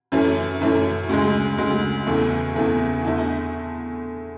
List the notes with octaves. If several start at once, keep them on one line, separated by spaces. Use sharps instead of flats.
F#2 E3 A3 C#4
F#2 E3 A3 C#4
D2 C#3 G#3
D2 C#3 G#3
E2 C#3 E3 A3
E2 C#3 E3 A3
E2 D3 A3 E4